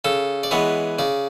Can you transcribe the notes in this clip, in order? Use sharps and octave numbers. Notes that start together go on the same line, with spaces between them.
C#3 A4
D5
E3 G#3 B3 C#5
C#3 D5